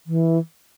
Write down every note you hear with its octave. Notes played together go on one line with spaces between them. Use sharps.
E3